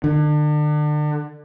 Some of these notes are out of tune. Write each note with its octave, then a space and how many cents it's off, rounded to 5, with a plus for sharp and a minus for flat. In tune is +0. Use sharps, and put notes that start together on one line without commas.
D3 +35